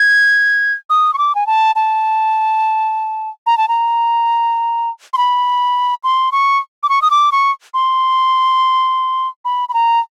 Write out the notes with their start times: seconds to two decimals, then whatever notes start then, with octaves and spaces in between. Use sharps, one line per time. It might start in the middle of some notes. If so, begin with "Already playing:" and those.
Already playing: G#6
0.90 D#6
1.14 C#6
1.18 D6
1.35 G#5
1.47 A5
1.76 A5
3.46 A#5
3.58 A5
3.68 A#5
5.13 C6
5.17 B5
6.04 C6
6.32 C#6
6.83 D6
6.89 C#6
7.02 D#6
7.11 D6
7.32 C#6
7.74 C6
9.45 B5
9.69 B5
9.74 A#5